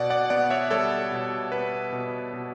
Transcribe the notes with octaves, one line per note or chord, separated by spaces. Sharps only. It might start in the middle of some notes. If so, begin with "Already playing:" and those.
Already playing: B2 D5 F#5
D5 F#5
B3 D5 F#5
C#5 E5
G3 A4 C#5
B2
B3 B4
B2
B2